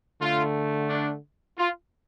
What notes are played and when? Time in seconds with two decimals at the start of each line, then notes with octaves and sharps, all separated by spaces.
0.22 D3 A3 F4
0.90 D4
1.58 F4